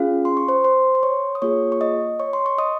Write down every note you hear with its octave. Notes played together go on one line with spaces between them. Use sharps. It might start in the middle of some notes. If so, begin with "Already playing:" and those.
Already playing: C#4 F4 G#4 F5
C6
C#6
C5 C6
C5 C6
C6
C#5 C#6
D#6
A#3 F4 G#4 C#5 C#6
C#6
D#5 D#6
C#5 C#6
C6
C#6
D#5 D#6